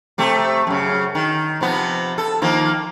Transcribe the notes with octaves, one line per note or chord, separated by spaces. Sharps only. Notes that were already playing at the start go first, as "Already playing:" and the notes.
C3 A3 G4
F#2 C#3
D#3
C3 F3 B3
A4
D#3 F3 A#3